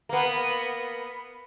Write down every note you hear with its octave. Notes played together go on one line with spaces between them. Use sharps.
A#3 B3